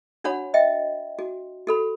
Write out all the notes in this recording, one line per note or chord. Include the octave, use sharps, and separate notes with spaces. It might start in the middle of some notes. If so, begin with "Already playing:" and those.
D4 F#4 C#5 F#5 B5
D#5 E5 G5
F#4
F#4 A4 B5